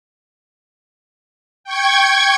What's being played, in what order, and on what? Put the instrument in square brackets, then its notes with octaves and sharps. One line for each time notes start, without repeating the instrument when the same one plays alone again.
[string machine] G5 C#6 G#6